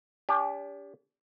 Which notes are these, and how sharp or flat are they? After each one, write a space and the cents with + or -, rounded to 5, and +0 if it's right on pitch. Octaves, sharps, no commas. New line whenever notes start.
D4 -40 G4 +30